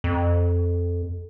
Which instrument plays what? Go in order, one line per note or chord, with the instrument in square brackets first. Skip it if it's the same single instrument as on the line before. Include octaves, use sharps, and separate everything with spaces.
[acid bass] F2